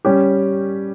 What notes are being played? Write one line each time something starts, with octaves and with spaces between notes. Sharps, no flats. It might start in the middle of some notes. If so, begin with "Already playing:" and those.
G3 C#4 G4